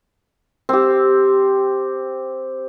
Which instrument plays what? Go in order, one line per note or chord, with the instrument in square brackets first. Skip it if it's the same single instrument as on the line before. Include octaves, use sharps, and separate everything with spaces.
[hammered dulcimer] C4 G4